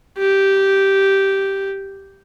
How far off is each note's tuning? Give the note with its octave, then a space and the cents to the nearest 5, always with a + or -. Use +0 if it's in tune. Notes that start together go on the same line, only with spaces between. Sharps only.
G4 -10